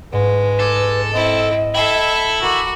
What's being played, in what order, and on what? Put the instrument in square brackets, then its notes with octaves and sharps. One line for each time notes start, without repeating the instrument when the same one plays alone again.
[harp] G#2 [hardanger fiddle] G#3 [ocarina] B4
[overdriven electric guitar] A4 [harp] D6 G#6 A#6
[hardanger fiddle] C4 E4 [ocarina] D#5 [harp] D#6 F#6
[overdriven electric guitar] E4 [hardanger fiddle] A4 E5 [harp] G5 G#6 C7
[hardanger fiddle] F#4 [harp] A#4 B5 D6